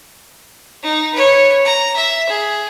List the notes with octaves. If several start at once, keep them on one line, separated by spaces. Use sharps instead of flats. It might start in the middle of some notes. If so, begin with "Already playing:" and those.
D#4
B4 C#5
A#5
E5
G#4